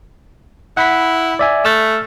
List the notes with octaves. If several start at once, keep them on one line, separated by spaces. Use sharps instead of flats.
E4 F#5 B5 B6
D5 E5 G#5
A3 E6 F6 A6